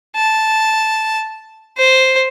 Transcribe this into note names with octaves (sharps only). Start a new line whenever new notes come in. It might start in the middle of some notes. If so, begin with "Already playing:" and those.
A5
C5